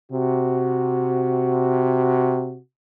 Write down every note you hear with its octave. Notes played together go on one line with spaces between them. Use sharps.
C3 F#4